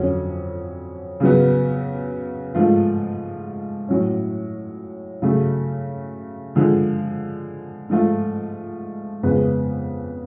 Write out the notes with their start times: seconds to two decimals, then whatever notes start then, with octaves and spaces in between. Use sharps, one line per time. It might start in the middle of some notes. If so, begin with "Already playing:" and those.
Already playing: F2 D3 F#3 C#4
1.20 C#3 F#3 B3
2.55 G#2 F3 A3 F4
3.89 A2 F#3 C#4
5.22 C#3 F#3 A3
6.55 D3 F3 G#3
7.89 G#2 F3 A3 F4
9.23 F2 C#3 G#3 B3